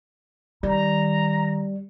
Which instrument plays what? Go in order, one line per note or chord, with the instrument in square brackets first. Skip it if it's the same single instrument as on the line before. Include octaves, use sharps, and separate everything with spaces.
[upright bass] D#3 [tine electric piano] G3 [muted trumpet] A#5